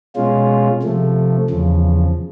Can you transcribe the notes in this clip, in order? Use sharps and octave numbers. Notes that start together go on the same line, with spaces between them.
B2 G#3 C#4 F4
C3 F3 A3
E2 C#3 F3